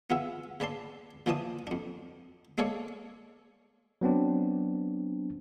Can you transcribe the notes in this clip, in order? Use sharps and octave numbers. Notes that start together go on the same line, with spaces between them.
B3 F4 G#4 E5
C#3 B4 D5 A5 C6
A#2 E3 F3 D5 A5 D#6
F2 D4
G#3 A#3 G#4 A4 C#5 D5
F#3 B3 C4 D4